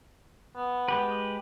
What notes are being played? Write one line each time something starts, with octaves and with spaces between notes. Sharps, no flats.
B3
G#3 G4 B4